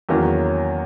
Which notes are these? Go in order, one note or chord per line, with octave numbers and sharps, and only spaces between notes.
E2 D#3 F#3 A#3 C#4